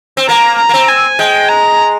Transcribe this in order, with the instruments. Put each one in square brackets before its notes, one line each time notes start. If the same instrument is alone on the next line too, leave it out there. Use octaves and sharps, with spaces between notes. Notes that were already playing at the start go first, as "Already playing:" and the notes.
[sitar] C4
[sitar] A#3 [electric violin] A#5
[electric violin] A#5
[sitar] A#3
C4
[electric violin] G#5
[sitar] G#3 [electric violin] G5
[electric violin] A#5